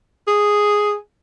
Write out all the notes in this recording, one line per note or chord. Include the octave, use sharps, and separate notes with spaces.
G#4